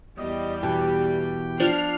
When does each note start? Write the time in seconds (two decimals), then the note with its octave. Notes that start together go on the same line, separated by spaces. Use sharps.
0.18 E2 G3 D#5
0.63 B2 E3 G4 G5
1.60 F3 D4 F6 C7